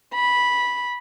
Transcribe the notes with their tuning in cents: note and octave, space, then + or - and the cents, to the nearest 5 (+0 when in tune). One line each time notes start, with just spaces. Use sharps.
B5 -10